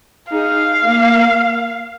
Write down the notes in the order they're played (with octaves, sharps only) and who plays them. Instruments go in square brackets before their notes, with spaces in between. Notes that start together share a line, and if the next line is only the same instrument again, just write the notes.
[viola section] D#4 G#4 [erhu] F5
[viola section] A#3